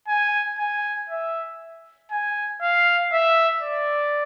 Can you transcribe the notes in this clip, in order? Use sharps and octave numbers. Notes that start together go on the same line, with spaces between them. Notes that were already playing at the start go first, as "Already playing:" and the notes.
G#5
G#5
E5
G#5
F5
E5
D5